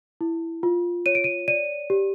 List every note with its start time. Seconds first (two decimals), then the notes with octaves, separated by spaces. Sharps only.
0.21 E4
0.63 F4
1.06 C#5 D#7
1.15 D7
1.24 D#7
1.48 D5 D#7
1.90 G4